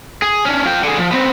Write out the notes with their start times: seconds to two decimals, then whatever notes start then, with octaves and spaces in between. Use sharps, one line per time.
0.22 G#4
0.45 C#4 D4
0.66 F4 G5
0.84 D3 G#4
0.99 F3
1.11 B3 C4